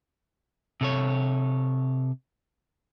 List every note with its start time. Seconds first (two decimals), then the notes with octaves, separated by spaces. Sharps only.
0.81 C3 A4 C#5